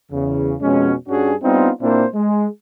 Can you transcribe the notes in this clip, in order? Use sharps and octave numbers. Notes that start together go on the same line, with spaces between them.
E2 C#3
F2 B2 G#3 C#4
G2 G3 C#4 D4 F#4 G#4
G3 B3 C4 D4 D#4 F4
A#2 A#3 C4 D4 E4 C5
G#3